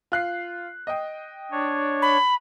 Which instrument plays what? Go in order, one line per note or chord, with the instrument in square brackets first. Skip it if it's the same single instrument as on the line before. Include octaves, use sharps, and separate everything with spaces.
[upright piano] F4 F#6 C7
D#5 G5
[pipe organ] D4 C#5
[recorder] B5